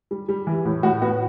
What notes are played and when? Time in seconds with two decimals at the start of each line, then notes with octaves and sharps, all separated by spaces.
0.11 G3
0.29 G3
0.47 E3
0.65 A2
0.83 A2 F#4
1.02 B3 F#4